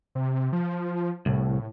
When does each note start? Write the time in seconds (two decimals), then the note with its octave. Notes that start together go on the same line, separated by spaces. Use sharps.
0.15 C3
0.53 F3
1.26 C2 A2